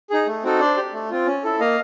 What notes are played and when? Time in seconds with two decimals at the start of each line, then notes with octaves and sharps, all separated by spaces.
0.10 D#4 G#4
0.27 A3
0.43 C4 D#4 F#4 A4
0.60 D4 C5 D5
0.77 G4
0.93 A3
1.10 C4 F4
1.27 C#4
1.43 E4 A4
1.60 A#3 D#5 F5